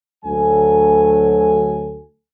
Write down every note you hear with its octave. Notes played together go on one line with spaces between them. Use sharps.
D2 F#3 A4 G#5